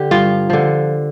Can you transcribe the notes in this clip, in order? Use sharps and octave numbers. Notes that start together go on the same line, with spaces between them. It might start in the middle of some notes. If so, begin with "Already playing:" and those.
Already playing: D3 G4
G2 F4
D3 F3